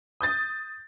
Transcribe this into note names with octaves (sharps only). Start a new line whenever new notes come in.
D#6 G6 A6